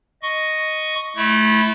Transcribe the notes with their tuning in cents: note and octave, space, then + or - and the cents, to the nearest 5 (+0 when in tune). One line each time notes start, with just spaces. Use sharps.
D#5 +0 C#6 +0
A3 -25 E4 +5